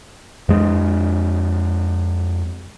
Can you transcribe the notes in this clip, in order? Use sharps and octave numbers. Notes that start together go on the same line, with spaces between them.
F2 G#3